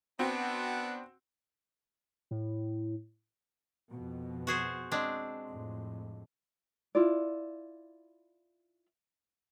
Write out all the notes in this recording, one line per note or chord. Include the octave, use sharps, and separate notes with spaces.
B3 C4 D4 F#4
A2
F2 B2
F#4 G#4 C5
G#3 C4 D4
F2 A2
E4 F4 D5